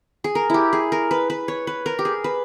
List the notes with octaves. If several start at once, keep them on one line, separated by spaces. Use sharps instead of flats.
G#4
A#4
E4 G4
G#4
A#4
B4
B4
C#5
B4
A#4
G4
G#4
B4